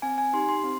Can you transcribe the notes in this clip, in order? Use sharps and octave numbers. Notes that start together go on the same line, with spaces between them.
C4 G#5
G#5
D#4 G4 C6
C6
C4